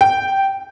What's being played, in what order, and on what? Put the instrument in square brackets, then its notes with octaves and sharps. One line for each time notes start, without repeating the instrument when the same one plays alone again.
[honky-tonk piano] G5